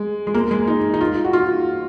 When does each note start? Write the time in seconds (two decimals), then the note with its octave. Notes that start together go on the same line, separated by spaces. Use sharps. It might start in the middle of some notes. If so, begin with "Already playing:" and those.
Already playing: G#3
0.27 G#3
0.34 A#3
0.51 G#3
0.67 D#4
0.94 D#4
1.01 F4
1.24 F#4
1.33 F4